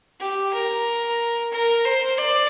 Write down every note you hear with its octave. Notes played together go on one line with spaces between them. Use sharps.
G4
A#4
A#4
C5
D5